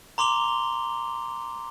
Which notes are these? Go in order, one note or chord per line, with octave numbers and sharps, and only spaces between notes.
A#5 C6 D6 F7 G7